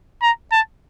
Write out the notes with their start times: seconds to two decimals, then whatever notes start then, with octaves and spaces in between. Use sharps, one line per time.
0.22 A#5
0.52 A5